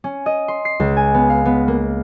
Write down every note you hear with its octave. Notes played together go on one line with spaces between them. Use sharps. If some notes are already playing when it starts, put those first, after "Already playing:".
C#4
D#5
C6
C7
C#2
G#5
B3
F5
B3
A#3